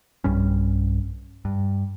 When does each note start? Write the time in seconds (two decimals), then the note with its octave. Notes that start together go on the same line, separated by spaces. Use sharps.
0.24 B1 G2 G3 C#4
1.45 G2